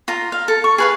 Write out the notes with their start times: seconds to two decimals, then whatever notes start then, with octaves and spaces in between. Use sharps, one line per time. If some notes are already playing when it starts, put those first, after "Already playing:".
0.08 F4 A#5
0.32 F5
0.48 A4
0.64 C#6
0.78 G#4 B4 F5